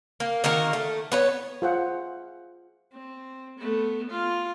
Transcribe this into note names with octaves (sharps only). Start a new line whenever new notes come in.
A#3
D#3 A#3 F#4 A#4
A3
B3 B4 C#5
F4 G#4 C5 E5 F#5
C4
A3 B3
F4